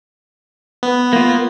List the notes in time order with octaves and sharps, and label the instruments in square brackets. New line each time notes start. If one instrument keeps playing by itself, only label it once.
[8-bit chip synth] B3
[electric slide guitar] A#3 F4